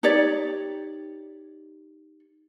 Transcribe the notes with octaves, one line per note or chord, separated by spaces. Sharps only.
D#4 G4 C#5 D5